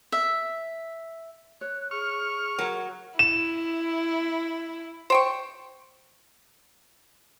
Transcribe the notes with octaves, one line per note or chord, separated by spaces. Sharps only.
E5
C#5 F#6
G#4 C#6 F6
F#3 A#4
E4 E7
C5 G5 C#6